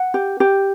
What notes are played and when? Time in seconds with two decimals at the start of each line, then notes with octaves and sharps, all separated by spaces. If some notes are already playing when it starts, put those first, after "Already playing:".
Already playing: F#5
0.14 G4
0.40 G4